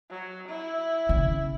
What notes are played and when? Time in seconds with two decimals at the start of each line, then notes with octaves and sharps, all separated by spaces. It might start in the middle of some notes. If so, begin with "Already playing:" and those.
0.11 F#3
0.48 E4
1.09 C#3